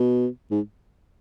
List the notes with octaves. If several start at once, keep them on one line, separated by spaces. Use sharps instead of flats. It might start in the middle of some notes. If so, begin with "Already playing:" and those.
Already playing: B2
G#2